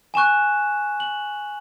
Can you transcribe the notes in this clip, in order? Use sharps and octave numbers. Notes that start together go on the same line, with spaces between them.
G#5 C#6 F#6 E7
F#7